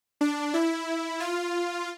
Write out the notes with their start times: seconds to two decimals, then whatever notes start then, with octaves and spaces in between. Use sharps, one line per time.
0.21 D4
0.54 E4
1.20 F4